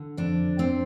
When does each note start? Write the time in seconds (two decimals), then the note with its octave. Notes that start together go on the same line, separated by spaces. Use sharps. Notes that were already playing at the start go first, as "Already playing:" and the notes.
Already playing: D3
0.17 F2 D4
0.59 C4